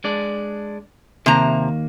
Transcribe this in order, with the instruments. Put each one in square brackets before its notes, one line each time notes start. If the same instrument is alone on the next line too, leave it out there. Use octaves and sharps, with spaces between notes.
[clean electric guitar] G#3 D4 D5
[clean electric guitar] D#2 A#3 [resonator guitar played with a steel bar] C3 A#5